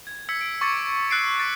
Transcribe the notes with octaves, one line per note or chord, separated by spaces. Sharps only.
G#6
E6 G#6 B6 C#7
D7
C#6 D6 A6 C#7
E6 F#6 A6 C7 D7
A6 B6 D7